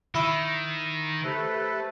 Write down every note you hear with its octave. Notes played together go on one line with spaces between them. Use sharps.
D#3 E4
A3 G4 A4 B4 C5 E5